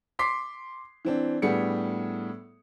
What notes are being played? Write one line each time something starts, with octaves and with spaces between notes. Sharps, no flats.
C6 D6 B6 C7
E3 C4 D4
A2 G3 B3 D4 G#4 C#7